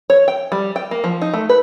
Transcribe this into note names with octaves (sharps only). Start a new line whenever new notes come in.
C#5
G5
G3
G5
A#3
F3
D#4
A3
B4